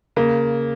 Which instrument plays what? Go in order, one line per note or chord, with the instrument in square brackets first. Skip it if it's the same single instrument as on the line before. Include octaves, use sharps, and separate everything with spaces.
[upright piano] C#3 [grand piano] A#3